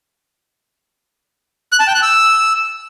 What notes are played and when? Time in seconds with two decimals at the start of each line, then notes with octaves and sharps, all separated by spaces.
1.72 F#6
1.80 A5
1.87 G5
1.95 F#6
2.02 E6